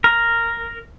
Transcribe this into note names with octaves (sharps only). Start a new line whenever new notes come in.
A#4